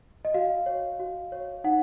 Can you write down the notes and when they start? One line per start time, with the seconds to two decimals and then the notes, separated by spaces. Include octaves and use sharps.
0.25 D#5
0.34 F#4 F5
0.66 C#5
0.99 F#4
1.32 C#5
1.64 D#4 F#5